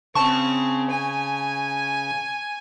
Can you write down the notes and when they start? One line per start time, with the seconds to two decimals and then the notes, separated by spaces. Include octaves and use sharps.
0.15 C#3 C4 A5 C#6
0.90 G#5